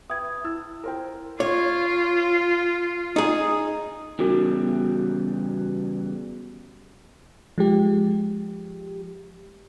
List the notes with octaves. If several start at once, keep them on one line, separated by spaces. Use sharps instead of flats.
B4 E5 G5 D#6 G#6
E4 E6
A#4 C5 G5
F4 C#5
D#4 G#4
C#3 E3 G3 B3 F#4
F3 G#3 G4